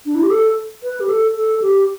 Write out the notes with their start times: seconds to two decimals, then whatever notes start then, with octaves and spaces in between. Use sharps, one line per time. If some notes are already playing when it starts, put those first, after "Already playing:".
0.06 D4
0.15 E4
0.23 G4
0.31 A4
0.83 B4
1.00 G4
1.09 A4
1.37 A4
1.62 G4